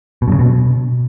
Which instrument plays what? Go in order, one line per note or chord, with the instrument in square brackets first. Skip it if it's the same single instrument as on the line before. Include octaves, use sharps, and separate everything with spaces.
[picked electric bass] B2
G2
C#3
B2